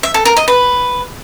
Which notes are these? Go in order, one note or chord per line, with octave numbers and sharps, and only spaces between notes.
E5
A4
A#4
D#5
B4